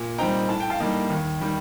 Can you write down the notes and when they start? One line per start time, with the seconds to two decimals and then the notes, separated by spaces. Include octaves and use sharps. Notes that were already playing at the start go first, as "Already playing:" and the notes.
Already playing: A#2
0.18 G3 C4 D#4 G5 A#5
0.49 A2 A5
0.60 G5
0.70 F5 A5
0.80 G3 A#3 D#4
1.10 D#2
1.41 D#3 G3